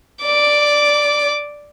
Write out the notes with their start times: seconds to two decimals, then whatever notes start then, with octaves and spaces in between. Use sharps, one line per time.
0.23 D5 D6